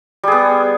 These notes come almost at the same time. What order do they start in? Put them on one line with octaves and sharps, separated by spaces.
G3 G#4 B3